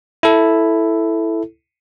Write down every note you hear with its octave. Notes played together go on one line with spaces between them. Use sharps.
E4 A4